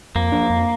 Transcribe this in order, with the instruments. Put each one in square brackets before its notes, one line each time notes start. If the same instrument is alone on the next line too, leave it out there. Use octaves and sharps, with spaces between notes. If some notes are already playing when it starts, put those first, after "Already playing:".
[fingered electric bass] F2 [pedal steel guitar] A#3
[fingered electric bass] F3 D4
F2